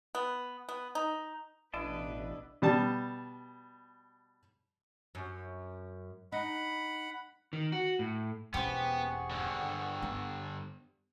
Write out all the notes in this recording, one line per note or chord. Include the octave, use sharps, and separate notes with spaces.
B3
B3
D#4
A1 B2 D4 E4 B4 D5 D#5 A5
B2 G3 A5
F#2
D#4 F#5 B5
D#3
F#4
A2
E1 B3 C#4 G4 G#4 C5 F#5 C#6
G2 D3
B3